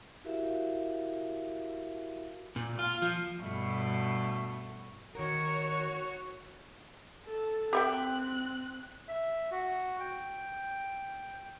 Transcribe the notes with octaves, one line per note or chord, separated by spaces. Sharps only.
E4 F#4 G4 A#4 E5 F5
A#2
F4
F3
G2 B2 A3
D#3 F#4 A#4 C#5
A4
C4 G4 E5 G5 F#6
E5
F#4
G5